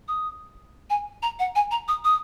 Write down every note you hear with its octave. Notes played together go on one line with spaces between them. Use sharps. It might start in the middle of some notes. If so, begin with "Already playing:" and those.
D#6
G#5
A#5
F#5
G#5
A#5
D#6
D#6